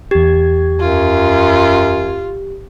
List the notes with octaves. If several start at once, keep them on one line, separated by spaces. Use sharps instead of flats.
E2 G4 G#6
F#2 F4